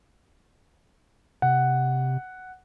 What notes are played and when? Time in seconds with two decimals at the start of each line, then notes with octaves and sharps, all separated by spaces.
1.42 C3 F#5